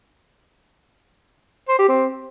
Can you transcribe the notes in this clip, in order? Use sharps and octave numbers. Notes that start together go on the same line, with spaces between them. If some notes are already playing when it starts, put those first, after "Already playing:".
C5
G4
C4